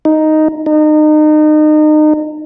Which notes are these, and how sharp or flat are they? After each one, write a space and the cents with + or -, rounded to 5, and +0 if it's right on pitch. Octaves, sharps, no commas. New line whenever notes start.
D#4 +0
D#4 -30